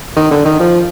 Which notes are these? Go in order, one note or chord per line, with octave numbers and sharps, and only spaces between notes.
D#3
D3
D#3
F3